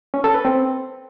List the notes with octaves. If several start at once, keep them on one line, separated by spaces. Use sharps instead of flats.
C#4
A4
B4
C4